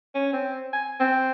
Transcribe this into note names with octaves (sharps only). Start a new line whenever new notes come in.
C#4
C4
G#5
C4